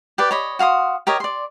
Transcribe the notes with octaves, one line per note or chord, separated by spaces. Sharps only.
G4 B4 D5
C#5 D#5 B5
F#4 F5 C6 D#6
G4 A#4 C#5 D#5
D5 C6